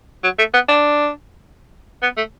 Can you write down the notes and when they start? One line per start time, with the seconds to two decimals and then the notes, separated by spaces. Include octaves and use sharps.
0.24 F#3
0.39 A3
0.54 B3
0.69 D4
2.03 B3
2.17 A3